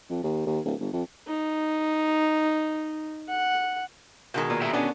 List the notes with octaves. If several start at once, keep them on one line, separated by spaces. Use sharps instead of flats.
F2
D#2
D#2
D1
G1
F2
D#4
F#5
B2 D#3 G#3
A#2
G4 A#4 E5
B3 C#4 D4